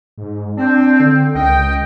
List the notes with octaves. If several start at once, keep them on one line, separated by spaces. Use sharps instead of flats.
G#2
C4 D4
D3
C#2 A#4 D#5 G5